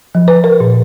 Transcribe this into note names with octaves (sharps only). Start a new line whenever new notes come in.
F3
B4
A#4
A#2